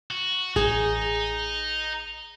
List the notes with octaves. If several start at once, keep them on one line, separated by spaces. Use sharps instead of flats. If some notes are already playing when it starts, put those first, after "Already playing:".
F#4
A1 D#4 G#4